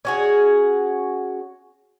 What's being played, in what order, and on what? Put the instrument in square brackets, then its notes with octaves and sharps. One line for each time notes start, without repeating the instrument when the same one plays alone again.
[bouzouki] C#4 F#4 G#4